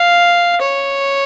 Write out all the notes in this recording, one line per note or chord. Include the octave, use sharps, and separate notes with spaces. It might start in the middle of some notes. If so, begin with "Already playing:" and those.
Already playing: F5
C#5